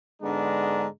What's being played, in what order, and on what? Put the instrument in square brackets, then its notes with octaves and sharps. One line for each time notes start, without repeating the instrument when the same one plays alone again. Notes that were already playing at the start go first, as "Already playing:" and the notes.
[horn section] G#2 D3 G#3 B3 D4 A#5